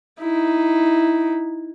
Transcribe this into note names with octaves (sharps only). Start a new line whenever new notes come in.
D#4 E4